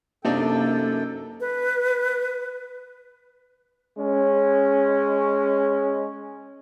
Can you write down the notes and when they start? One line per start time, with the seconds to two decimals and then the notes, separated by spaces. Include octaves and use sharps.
0.25 F#2 C3 A#3 D4 D#4 A4 G5
1.40 B4
3.98 G#3 C#4